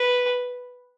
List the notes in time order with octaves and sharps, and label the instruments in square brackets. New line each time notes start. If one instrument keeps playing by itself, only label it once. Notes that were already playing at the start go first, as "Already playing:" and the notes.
Already playing: [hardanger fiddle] B4